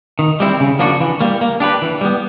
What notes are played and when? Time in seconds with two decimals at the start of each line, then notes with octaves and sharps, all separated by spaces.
0.19 D#3
0.40 G3 C4 E4
0.60 C#3
0.79 F3 A#3 D4 F#4
1.00 E3
1.21 G3 A#3
1.41 A#3
1.60 D4 G4 B4
1.82 E3
2.01 G3 B3